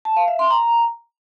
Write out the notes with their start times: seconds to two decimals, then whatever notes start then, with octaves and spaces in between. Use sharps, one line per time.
0.05 A5
0.17 F5
0.28 E5
0.39 C6
0.51 A#5